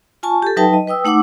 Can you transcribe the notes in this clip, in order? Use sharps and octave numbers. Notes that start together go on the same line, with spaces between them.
F4 G#5 A5 C#6
G4 A4
F#3 D#4 B4 E5 G5 A5
D#5
B4 G5 D#6 E6
A3 D#4 F#5 D6 E6